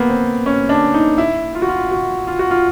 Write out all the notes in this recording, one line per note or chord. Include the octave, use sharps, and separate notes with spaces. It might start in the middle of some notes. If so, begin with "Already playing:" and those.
Already playing: A#3 B3
C4
C#4
D4
D#4
E4
F4
F#4
F4
F#4
F4
F#4
F4